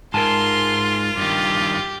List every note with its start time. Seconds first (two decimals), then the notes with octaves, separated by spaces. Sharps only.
0.14 G#2 F4 A#4 G#5 A5 C6
1.17 G2 D#3 G4